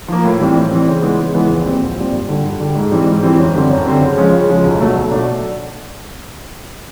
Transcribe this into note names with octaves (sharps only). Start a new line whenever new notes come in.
F3 A#3
A2
E3 G3 C4
A2
E3 G3 C4
C#3
E3 G#3 B3
C#3
E3 G#3 B3
A#1
A#2 G3 C4
A#1
A#2 G3 C4
G2
D3 G3
G2
D3 G3
G#2
E3 G3 C4
G#2
E3 G3 C4
F#2
D3 G3 C4
F#2
D3 G3 C4
C#3
F3 G#3 C#4
C#3
F3 G#3 C#4
B1
B2 F#3 A3 D4
B1
B2 F#3 A3 D4